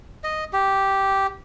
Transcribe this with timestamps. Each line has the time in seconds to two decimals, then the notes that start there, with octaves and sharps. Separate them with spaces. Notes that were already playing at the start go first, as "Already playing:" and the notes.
0.24 D#5
0.53 G4